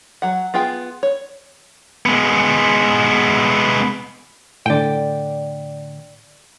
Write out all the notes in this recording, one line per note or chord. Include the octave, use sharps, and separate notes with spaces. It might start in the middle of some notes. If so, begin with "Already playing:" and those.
F#3 F#5
B3 F4 G#4 G5
C#5
G#3 B3
A2 D3 D5 G5